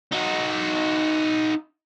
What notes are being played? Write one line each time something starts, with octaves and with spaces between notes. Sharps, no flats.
D#4 F#4